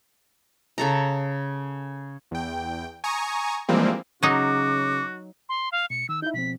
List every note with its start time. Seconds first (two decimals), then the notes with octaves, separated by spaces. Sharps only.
0.78 C#3 A4 A#5
2.31 E2 G5
3.04 G#5 A#5 C#6 D#6
3.69 E3 F3 G3 G#3 A#3 C4
4.23 C#3 F#3 D#4 F#4 D6
5.49 C6
5.72 F5
5.90 B2 C#7
6.09 D#3 E6
6.22 D#4 E4 E5 G6
6.34 B2 F3 C4 B6